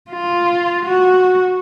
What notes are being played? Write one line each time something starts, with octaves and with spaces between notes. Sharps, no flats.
F4
F#4